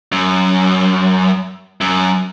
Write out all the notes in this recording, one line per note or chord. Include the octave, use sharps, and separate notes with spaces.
F#2
F#2